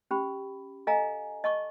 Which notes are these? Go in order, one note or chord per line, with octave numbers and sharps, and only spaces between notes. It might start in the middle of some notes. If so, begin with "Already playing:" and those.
C#4 G4 B5
A4 D#5 F5 G#5 A#5
D#5 A5 C#6 D6